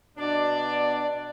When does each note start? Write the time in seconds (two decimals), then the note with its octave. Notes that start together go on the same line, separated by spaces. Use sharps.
0.18 B2 D4 D5